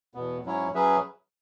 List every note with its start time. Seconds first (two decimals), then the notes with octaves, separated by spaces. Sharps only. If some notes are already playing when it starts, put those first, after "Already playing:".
0.14 E2 B2 B3
0.44 G#2 F#3 C#4 E4 C#5
0.74 F#3 C#4 G#4 B4 E5